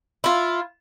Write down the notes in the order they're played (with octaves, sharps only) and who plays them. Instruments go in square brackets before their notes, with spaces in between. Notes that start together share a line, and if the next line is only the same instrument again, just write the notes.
[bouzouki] E4 F4